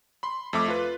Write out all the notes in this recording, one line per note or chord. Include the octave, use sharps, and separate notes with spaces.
B5 C6
F2 A3 E5 D6
F4 B4